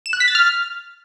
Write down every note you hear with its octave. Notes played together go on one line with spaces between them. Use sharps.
E7
F#6
B6
A6
F6